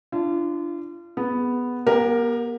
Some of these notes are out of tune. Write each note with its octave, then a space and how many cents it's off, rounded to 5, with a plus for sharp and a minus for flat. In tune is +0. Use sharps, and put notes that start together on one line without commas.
D4 +5 F4 -35
B3 +0 G#4 +0
B3 -45 G4 +15 A#4 +0